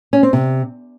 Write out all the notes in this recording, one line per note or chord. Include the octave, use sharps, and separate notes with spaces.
C#4
C4
C3